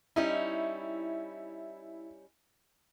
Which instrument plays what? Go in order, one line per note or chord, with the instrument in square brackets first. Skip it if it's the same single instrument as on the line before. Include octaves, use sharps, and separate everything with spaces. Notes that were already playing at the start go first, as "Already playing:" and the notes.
[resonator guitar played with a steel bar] G3 C#4 D#4 [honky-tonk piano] E4